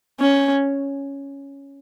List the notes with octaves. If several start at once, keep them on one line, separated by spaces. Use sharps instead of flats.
C#4